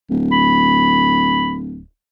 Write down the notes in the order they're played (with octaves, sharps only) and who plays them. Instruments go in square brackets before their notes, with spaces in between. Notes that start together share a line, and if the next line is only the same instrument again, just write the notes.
[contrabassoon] D1
[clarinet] B5